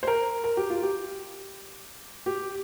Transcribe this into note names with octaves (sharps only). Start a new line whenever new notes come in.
C5
A#4
A#4
G4
F4
G4
G4